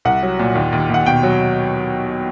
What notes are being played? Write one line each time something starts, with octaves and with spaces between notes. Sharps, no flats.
C2 F#5
F#3
A#2
D#2
D#2
D#2 F#5
B2 G5
F#3